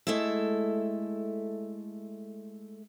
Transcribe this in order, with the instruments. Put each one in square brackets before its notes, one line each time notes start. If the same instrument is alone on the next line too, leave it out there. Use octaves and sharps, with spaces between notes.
[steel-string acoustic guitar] G#3 A3 E4 A4 E5